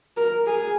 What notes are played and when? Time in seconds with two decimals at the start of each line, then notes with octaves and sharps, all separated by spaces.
0.17 A#4
0.47 G#4